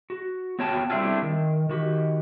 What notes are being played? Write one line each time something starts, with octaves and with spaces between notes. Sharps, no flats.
F#4
B3 F#4 C#5 G5 A5
G3 A3 C4 D4 E4 F4
D#3
D#3 F#4 G4